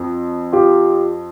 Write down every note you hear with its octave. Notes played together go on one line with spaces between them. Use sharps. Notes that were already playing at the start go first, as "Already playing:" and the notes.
Already playing: F2
F4 G4